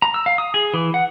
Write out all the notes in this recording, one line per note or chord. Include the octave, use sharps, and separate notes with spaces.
A#5
E6
F5
D#6
G#4
E3
F#5